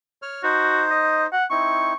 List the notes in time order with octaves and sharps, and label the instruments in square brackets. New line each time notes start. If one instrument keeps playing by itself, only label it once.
[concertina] C#5 F6
[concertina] D#4 C5 [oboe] F#4
[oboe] D#5
F#5
[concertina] C4 D#4 E4 [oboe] C#6